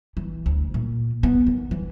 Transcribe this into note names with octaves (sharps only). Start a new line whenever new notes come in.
E3
D2
A#2
B3
D#3
E3